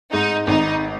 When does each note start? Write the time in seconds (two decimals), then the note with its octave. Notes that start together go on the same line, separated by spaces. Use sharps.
0.13 G#2 D#4
0.47 G#1 D#4